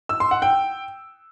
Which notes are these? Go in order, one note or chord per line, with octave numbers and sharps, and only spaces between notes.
E6
C6
F#5
G5